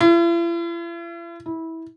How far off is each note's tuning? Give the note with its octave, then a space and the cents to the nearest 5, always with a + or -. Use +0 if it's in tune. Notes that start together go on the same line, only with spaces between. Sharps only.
E4 +45
E4 -20